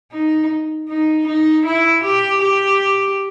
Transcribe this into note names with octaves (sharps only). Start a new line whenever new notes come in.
D#4
D#4
D#4
E4
G4
G4